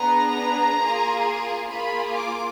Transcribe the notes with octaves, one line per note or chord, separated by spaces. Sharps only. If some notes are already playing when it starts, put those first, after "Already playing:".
Already playing: B3 D4 G#4 A#5
A#3 F4 G#4
A#3 F4 G#4 B5
D6